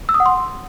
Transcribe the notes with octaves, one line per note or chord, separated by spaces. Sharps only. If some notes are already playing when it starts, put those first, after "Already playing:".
E6
D#6
F#5
C6